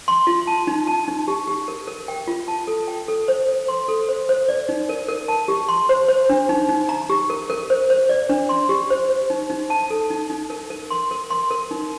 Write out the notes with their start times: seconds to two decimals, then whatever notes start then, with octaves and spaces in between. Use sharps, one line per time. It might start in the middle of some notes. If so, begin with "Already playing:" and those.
0.08 C6
0.27 F4
0.47 A5
0.67 D#4
0.87 A5
1.08 D#4
1.28 G4
1.47 G4
1.68 A#4
1.88 A#4
2.08 G5
2.28 F4
2.48 A5
2.67 A4
2.88 G5
3.08 A4
3.28 C5
3.48 C5
3.68 C6
3.88 A4
4.09 C5
4.29 C5
4.49 D5
4.69 D#4
4.89 A#4
5.09 A#4
5.28 A5
5.48 G4
5.69 C6
5.89 C5
6.08 C5
6.30 D4
6.49 D#4
6.69 D#4
6.89 A#5
7.10 G4
7.30 A#4
7.50 A#4
7.70 C5
7.90 C5
8.09 D5
8.29 D4
8.49 C6
8.69 G4
8.90 C5
9.10 C5
9.30 D#4
9.50 D#4
9.70 A5
9.90 A4
10.10 D#4
10.30 D#4
10.50 A#4
10.70 A#4
10.91 C6
11.11 A#4
11.30 C6
11.51 A#4
11.71 D#4